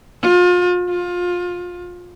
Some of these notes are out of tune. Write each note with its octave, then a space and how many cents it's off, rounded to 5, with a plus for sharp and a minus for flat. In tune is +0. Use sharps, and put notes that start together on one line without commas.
F4 +35
F4 +25